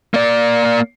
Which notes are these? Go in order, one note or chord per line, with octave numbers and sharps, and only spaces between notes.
A#3 D5